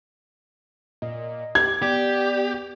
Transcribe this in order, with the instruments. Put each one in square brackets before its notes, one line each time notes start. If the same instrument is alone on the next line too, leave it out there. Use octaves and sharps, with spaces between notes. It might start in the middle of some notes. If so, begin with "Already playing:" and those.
[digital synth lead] A#2 [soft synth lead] D#5
[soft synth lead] G4 [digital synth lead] D6 [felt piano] G#6
[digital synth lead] B3 [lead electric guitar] G4 [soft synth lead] D5